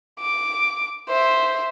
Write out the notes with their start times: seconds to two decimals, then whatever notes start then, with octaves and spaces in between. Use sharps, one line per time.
0.20 D6
1.09 C5 E5